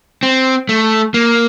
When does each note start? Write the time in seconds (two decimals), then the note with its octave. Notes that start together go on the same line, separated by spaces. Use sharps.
0.23 C4
0.69 A3
1.14 A#3